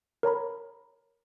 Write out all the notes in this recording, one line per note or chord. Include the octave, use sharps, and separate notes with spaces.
A#4 C#5 A#5 B5